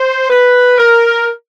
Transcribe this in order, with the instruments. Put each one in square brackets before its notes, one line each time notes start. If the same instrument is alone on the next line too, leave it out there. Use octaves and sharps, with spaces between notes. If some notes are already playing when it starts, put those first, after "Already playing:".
Already playing: [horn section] C5
B4
A#4